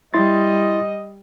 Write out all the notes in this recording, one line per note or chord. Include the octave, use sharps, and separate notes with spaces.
G3 E4 D#5 C6 A6